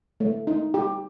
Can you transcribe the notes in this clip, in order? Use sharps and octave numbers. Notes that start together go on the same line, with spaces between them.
A3
D#4
G4